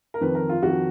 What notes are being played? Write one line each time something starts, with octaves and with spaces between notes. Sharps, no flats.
A#4
F2 D#3 B4
A#4
F4
F2 D#3 F#4